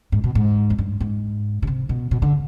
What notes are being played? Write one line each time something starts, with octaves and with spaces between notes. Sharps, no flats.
G#2
B2
G#2
F2
G2
G#2
B2
C3
B2
B2
D3